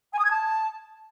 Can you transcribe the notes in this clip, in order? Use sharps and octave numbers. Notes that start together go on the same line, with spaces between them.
G#5
D#6
G#6
A5